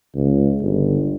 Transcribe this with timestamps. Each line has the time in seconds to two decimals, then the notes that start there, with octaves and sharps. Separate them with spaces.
0.15 C#2
0.62 G1